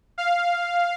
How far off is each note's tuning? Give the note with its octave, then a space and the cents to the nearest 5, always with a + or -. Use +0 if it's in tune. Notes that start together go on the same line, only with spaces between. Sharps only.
F5 +0